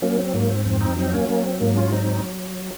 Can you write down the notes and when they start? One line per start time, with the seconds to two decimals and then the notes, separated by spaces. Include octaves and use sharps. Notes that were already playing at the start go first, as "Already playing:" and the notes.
0.02 F#3 A#3 C#4
0.19 C4
0.34 G#2 A#3
0.49 C4
0.65 F2 C4
0.81 C4 D#4
0.97 F#3 C4 D#4
1.13 A#3 C#4
1.28 F#3 A#3 C#4
1.44 C4
1.60 G#2 A#3
1.76 C#4 F4
1.92 F#3 C4 D#4